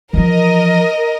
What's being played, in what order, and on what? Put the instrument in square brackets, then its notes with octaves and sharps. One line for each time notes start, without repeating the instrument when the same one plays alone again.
[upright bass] E3 F3 [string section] A#4 D#5